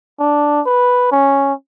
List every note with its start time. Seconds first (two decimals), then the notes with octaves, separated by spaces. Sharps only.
0.19 D4
0.66 B4
1.12 C#4